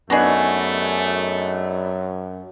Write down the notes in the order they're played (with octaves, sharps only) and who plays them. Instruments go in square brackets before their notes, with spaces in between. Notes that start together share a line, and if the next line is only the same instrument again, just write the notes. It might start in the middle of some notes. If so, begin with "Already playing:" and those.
[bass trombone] F#2 [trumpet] A3 [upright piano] B3 D4 D#4 [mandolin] F#4 G#4